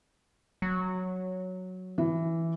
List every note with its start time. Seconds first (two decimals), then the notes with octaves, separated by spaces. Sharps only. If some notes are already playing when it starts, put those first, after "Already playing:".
0.62 F#3
1.98 E3